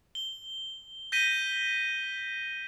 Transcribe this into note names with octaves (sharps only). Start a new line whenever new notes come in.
G7
G6 A#6 B6 D#7 G7